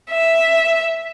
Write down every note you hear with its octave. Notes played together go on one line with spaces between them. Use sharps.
E5